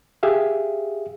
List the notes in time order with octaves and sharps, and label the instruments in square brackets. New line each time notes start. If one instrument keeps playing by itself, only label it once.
[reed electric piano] G4 G#4 E5 F5